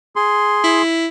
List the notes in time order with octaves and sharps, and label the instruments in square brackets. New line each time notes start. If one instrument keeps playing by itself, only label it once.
[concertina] G#4 C6
[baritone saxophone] E4